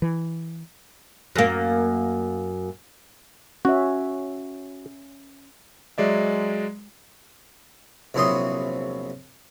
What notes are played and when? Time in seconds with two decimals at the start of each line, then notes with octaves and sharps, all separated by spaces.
0.02 E3
1.36 F#2 A#3
3.65 C#4 F#4 E5
5.98 F#3 G#3 D5 E5
8.14 A#1 E2 C3 F#3 C6 D#6